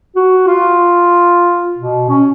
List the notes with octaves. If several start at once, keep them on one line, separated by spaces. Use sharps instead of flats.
F#4
F4
B2
C#4